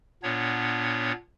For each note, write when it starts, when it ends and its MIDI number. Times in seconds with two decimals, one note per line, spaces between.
0.23 1.12 46
0.23 1.12 59
0.23 1.12 62
0.23 1.12 73